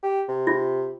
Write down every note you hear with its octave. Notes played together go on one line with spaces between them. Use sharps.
G4
C3
F4